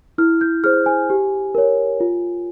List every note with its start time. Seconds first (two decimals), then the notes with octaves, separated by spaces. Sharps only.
0.18 E4 F6
0.41 G6
0.64 G#4 C5 F6
0.86 G#5
1.10 G4
1.55 A#4 C#5
2.00 F4